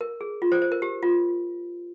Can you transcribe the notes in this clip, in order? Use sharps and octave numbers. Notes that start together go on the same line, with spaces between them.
A#4
G#4
F4
C5
C5
A#4
G4
F4